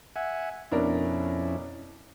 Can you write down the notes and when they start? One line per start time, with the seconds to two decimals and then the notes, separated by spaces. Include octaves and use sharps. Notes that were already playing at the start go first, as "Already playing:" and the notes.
0.16 E5 F#5 G#5
0.72 F2 B2 C#4 D4 E4 A#4